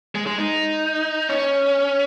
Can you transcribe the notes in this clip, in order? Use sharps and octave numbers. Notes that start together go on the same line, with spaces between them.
G#3
G#3
D#4
C#4